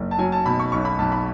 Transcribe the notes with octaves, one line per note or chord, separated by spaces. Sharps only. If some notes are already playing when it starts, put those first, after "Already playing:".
Already playing: F#1
A5
F#3 G#5
A5
B2 B5
C#6
B1 C#6
B5
B1 A5
B5